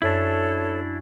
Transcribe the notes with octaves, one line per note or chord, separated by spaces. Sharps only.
F#2 D4 E4 A4 C#5 E7